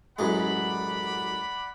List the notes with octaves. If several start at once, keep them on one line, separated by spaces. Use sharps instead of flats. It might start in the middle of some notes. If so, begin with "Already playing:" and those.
A1 F#2 G#3 D5 F#5 B5